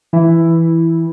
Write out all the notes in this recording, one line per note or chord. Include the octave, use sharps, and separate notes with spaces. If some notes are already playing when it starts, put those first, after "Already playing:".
E3 E4